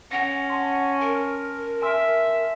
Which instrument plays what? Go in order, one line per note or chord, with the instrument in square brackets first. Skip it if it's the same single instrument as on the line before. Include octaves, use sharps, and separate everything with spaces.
[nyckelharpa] C#4 [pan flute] F#5 [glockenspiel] A#6 F7
[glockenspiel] A5 C6
[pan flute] A#4
[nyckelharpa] E5 [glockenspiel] G#5 C6 E6